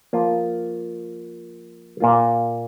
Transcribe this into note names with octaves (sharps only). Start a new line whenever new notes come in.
F3 A#3 F4
A#2 A#3 F4